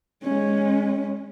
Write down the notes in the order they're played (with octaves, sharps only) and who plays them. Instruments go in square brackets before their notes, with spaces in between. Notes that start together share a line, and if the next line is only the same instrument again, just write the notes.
[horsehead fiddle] G#3 C#4